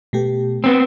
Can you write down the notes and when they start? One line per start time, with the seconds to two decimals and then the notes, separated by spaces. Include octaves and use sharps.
0.13 B2 A3 G4
0.64 B3 C4